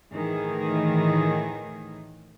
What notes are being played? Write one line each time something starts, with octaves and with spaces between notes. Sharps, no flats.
A2 D#3 E3 G#4